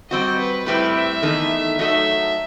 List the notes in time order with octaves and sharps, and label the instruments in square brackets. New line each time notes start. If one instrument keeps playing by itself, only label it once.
[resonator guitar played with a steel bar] G3 C4 F#4 [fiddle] D#5
[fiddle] B4
[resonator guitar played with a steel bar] A2 G3 C4 E4 G4 [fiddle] B4
[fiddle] E5
[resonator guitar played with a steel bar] E2 D#3 A3 D#4
[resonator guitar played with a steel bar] F#3 A3 D#4 A4 D#5 [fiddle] E5